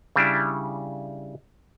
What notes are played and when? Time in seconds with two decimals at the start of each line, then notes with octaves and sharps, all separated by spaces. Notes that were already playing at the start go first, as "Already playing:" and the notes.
0.16 C#3 G3 D4 E4